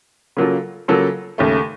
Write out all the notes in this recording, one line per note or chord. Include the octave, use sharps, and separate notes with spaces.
C#3 F#3 A#3 F4 A4
C#3 F#3 A#3 F4 A4
D#2 C#3 A3